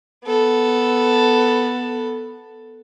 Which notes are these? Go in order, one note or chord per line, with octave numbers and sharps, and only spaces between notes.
B3 A4